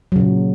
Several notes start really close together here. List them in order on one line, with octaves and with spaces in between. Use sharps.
F#3 C#3 A#2